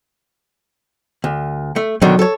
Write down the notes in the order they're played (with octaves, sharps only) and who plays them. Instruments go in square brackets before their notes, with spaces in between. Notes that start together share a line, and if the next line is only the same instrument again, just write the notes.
[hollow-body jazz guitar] D2
A3
[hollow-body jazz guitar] B2 D3 D#3 [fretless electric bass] F#3
[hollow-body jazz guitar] A4 C#5